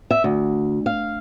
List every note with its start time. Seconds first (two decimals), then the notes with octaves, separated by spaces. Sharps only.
0.11 E5
0.24 D2
0.86 F5